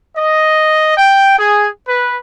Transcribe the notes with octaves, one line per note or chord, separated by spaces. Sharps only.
D#5
G5
G#4
B4